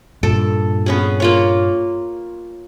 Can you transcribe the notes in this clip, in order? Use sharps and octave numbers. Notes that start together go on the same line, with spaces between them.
G2 A#2 A4
B3 C#4 G#4
A#3 F4 C#5